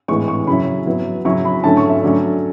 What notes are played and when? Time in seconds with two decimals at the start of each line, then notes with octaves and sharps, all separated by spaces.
0.08 A2 E3 G#3 C#6
0.28 C#6
0.47 C#3 F#3 C#4 E4 B5
0.86 F#3 B3 E4
1.25 C#3 F#3 C#4 E4 C#6
1.45 B5
1.64 D3 F#3 A3 C#4 E4 A5
1.77 C#6
1.90 E5
2.03 D3 F#3 A3 C#4 D5